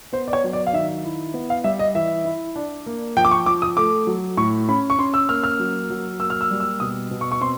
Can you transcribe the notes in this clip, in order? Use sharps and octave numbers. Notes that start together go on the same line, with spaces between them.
B3 C5
D5
C#5
F#3
D5
F5
D#3 E5
E4
B3
F5
G3 E5
D#5
E3 E5
E4
D4
A#3
F3 G5
D6
C#6
F3 D6
D#6
A3 D6
F#3
A2 C#6
C#4 B5
C#6
C#4 C6
E6
A#3 F6
F6
F#3
F#3
A#3 E6
F6
E6
G3
E6
B2 D#6
B2
C#6
C#6
C4 C6